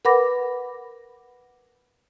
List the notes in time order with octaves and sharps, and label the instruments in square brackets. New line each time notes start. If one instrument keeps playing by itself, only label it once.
[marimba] A#4 B4 F#5 B5 D6 A#6